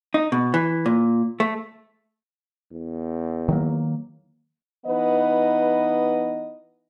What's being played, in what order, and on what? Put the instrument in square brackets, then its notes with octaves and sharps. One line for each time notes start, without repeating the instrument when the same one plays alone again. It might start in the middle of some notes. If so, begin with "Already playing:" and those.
[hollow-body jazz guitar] D#4
B2
E3
A#2
A3
[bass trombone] E2
[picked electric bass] D#3 F#3 A#3
[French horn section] E3 B3 D#4 B4 D#5